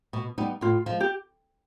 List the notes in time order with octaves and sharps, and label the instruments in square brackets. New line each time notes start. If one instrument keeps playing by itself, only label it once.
[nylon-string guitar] B2
G3 B3 D#4
[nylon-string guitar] A2 [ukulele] F4
[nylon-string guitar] F3 G#3
[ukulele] G4